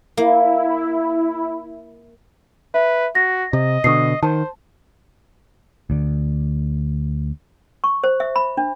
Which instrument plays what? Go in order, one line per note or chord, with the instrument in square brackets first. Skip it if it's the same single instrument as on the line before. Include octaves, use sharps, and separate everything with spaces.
[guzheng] A#3 [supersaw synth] E4
[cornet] B4 [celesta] E5
[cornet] F#4 [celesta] A#6
[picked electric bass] C3 [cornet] D#5
[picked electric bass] B2 D3 [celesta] C#6 D#6 C7
[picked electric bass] D#3 [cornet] C5 [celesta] A5
[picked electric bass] D2 D3
[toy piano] C#6
C5
E5
B5
D4